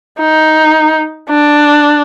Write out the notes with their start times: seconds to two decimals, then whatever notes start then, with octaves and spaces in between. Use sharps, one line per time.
0.19 D#4
1.29 D4